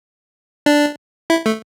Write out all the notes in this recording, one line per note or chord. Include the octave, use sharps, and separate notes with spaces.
D4
E4
A3